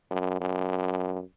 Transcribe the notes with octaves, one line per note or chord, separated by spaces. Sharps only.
F#2
F#2